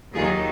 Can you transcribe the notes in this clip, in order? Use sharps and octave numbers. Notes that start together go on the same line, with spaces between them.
D#2 D#3 F#3 F4 G#4